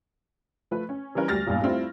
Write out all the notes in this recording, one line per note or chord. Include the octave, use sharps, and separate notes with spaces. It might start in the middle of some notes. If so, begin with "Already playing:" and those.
F3 A3 B4
C#4
E3 G3 C#4 A#4 B4
D2 G3 F6 A6 A#6
A#1 E2 G2
G3 A3 C4 E4 F4